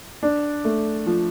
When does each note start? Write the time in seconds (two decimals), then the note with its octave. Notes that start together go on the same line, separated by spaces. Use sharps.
0.23 D4
0.65 A3
1.07 F3